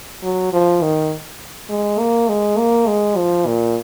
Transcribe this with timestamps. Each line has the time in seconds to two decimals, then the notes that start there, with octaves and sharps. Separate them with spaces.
0.23 F#3
0.53 F3
0.82 D#3
1.69 G#3
1.99 A#3
2.28 G#3
2.58 A#3
2.87 G#3
3.17 F3
3.46 A#2